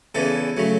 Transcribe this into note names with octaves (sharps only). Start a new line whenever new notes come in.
E2 C#3 E3 A4
C#3 F#3 A3